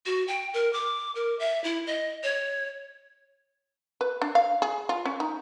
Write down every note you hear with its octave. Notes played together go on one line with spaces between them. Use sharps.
F#4
G5
A#4
D6
A#4
E5
E4
D#5
C#5
B4
D4
F5
G#4
F4
C#4
D#4